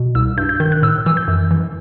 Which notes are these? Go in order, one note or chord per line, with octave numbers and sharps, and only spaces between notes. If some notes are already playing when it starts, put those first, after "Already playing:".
Already playing: B2
C2 E6
G2 G6
G6
D#3 G6
F#6
A2 E6
E3 E6
G6
F#2
E3